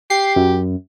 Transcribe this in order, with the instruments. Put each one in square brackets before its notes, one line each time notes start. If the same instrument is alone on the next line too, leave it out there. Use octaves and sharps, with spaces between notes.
[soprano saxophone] G4 [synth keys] C7
[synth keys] F#2